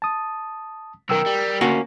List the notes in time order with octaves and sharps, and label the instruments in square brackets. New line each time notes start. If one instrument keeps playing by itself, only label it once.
[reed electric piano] A5 D#6
[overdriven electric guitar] B1 D#3 [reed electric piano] A#4 G5 E6
[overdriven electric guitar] G3
[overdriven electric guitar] D2 [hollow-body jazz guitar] A#3 C#4 F#4